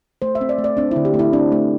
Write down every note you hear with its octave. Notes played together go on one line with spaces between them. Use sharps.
A3 C5
E5
C4
D5
A3
D5
C4 D4
E4
D3
G4
A3
E4
C4 D4
A3